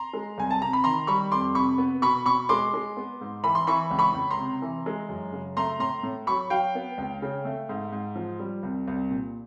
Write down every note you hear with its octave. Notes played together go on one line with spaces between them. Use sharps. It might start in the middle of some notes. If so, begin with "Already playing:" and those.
Already playing: A#5 C6
G#3
C2 G#5
A5
C3 A#5
B5
D#3 A#5 C6
G3 B5 C#6
F2 C6 D6
C3 B5 C#6
B3
B2 B5 C#6
B2 B5 C#6
G#3 C6 D6
G#3
B3
G#2
E3 B5
C6
E3 B5 C#6
C#2
B5 C#6
C#2
A#5 C6
C3
E3
G#3
F#2
C#3
A3 A#5 C6
A2 A#5 C6
A2
F#3 B5 C#6
F#3 F5 G5
B3
C#2
C#3
A3
G#2
G#2
F3
G3
C2
C2
A#2